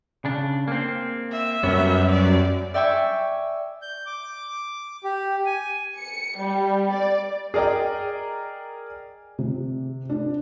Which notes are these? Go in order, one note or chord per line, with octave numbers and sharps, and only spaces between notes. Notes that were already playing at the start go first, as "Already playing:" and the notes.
C#3 D4
A#3 C4
E5
F#2 G3 B3 C#4
D5
D5 E5 G5 G#5 C#6 E6
G6
D6
G4
G#5
C#7
G3
D5
G#4 A#4 D5 D#5 G5
C3
D4